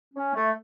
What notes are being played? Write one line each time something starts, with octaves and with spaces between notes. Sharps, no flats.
C#4
A3